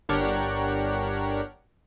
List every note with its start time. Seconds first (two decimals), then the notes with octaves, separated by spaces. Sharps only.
0.09 G1 D4 G4 A#4 C#5 F#5